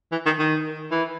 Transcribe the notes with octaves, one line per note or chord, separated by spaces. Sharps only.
E3
D#3
D#3
E3